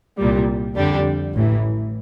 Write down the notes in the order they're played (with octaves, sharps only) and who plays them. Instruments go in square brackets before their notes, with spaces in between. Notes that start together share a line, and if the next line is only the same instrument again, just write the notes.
[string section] C2 A#2 G3
F2 D3 G3 D4 G4
A1 A2 E3